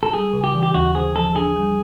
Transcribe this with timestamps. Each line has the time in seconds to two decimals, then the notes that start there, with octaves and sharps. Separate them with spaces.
0.03 A4
0.13 G3 G#4
0.33 C#3
0.44 G4
0.54 E3
0.63 G4
0.74 D#2 F#4
0.95 D3 G#4
1.15 F3 A4
1.35 D4 G#4
1.56 G3